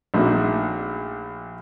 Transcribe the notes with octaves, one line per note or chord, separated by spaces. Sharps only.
A#1 A3 D#4 F#4 E5